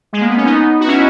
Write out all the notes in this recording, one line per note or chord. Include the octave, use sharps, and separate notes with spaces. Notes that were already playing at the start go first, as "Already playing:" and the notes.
G#3
A#3
B3
C#4
B3 D#4
F#4
C#4 E4